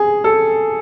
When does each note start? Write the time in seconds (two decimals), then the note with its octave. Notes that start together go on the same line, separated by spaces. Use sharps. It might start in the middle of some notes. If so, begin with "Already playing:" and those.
Already playing: G#4
0.24 A4